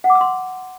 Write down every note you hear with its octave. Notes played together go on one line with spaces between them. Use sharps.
F#5
D6
E6
C6